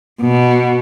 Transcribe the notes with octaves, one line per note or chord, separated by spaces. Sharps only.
B2